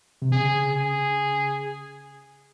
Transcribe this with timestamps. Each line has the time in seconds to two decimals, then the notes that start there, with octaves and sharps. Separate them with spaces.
0.22 C3
0.32 C#3 G#4
0.71 G#4